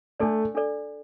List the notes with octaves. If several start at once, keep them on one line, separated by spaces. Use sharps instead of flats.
A3 D4 A4 D5
D4 A4 D5